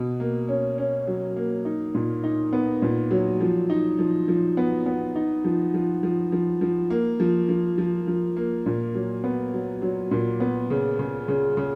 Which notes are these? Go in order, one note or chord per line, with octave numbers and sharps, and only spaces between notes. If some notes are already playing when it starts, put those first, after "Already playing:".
Already playing: B2
A#3
C#4
C#4
F#3
A#3
D#4
A#2
D#4
B3
A#2
F#3
F3
D#4
F3
F3
B3
B3
D#4
F3
F3
F3
F3
F3
A#3
F3
F3
F3
F3
A#3
A#2
F#3
B3
F#3
F#3
A#2
B3
C#3
C#3
C#3
C#3